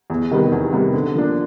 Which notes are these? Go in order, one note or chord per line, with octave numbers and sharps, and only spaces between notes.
E2
C3 D#3 G3 B3
E2
C3 D#3 G3 B3
D3
F3 A#3 D4